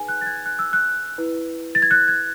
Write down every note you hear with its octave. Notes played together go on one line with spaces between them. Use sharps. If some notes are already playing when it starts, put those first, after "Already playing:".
Already playing: D#4 G#4 B4 G#5
F#6
A6
G#6
F#6
E6
F#6
E4 B4
A6
G#6
F#6
G#6